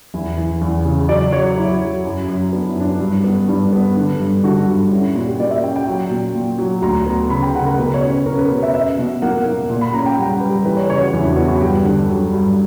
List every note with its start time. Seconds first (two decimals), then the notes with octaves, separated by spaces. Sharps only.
0.14 E2 E4
0.37 E3
0.61 E2
0.85 C#3
1.09 F#3 D5
1.32 F#3 C#5
1.56 F#3 E4
1.81 F#3
2.05 F#2
2.28 F#2
2.53 B3 D4
2.66 E4
2.76 F#2 D4
3.00 G2
3.24 B3
3.48 G2 D4
3.72 B3
3.96 D3
4.19 G2
4.44 D3 F#4
4.67 G2
4.91 C#4 E4
5.15 A#2 F#4
5.27 G4
5.40 A#3 D5
5.51 E5
5.63 C#4 G5
5.76 G5
5.87 F#3
6.11 A#2
6.35 A#2
6.58 F#3
6.82 D2 A#5
7.06 B3
7.30 C#3 B5
7.43 G5
7.55 C#3 F#5
7.67 A#4
7.78 B2 B4
7.94 C#5
8.03 C#4
8.10 B4
8.26 C#4 A#4
8.38 B4
8.50 B2 B4
8.63 E5
8.74 C#4 E5
8.98 B2
9.22 A#3 F#5
9.45 A#3
9.70 A#2
9.81 B5
9.94 C#4 A#5
10.06 G5
10.18 G3 F#5
10.41 G3 B4
10.65 E3 B4
10.77 C#5
10.89 C#3 C#5
11.01 F#4
11.13 E2 E4
11.25 D4
11.32 F#4
11.37 B3 E4
11.48 F#4
11.60 G2 G4
11.84 D3
12.09 F#3
12.32 G2